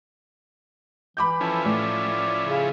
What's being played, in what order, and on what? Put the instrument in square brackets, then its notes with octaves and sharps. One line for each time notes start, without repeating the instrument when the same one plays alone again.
[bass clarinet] E3 [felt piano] B5 D6 G6
[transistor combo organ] F3 C#4 E4 [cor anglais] A4
[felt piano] A2 [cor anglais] D5
[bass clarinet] C#3